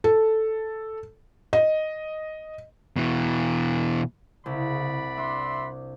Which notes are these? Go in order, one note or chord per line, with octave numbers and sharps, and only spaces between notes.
A4
D#5
B2 E3
C2 C#3 D5 F#5 B5
D4 E5 C6